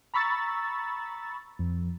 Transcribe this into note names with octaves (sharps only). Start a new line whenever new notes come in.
A#5 B5 C#6 E6 A6
F2